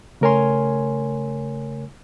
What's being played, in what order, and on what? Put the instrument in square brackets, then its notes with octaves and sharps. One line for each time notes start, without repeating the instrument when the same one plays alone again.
[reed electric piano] C#3 A3 A#4 C#5 G#5 C6